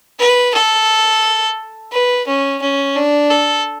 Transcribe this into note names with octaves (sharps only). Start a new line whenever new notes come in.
B4
A4
B4
C#4
C#4
D4
A4